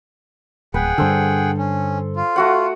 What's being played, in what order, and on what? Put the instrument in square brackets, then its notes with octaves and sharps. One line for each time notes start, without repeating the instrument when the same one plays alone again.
[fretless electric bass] D1 [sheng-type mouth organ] G#4 F#5 G5 [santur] B4
[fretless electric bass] G2 D3 [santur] A4 C5
[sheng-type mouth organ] C#4
F4
[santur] A3 F#4 F#5